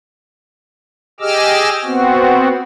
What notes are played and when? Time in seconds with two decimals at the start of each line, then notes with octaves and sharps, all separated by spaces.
1.20 G4 G#4 D#5 D6 E6 F6
1.84 B3 C4 F#4